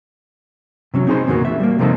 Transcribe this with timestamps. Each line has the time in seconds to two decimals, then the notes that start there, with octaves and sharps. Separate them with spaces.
0.94 C3 F#3 C#4
1.07 C4 D#4 G#4 C5
1.27 E2 A#2 C#3 F3 F#3 A#3
1.45 E5
1.60 G3 A#3
1.79 C3 F3 A#3 C4 D#4 A4